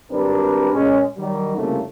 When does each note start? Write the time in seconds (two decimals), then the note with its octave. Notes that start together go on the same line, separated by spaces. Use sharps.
0.11 G#1 G3 C4 D4 A#4 B4
0.73 A#2 G#3 C#4
1.18 D#3 F#3 G3
1.57 C2 F2 C#3 A3 A#3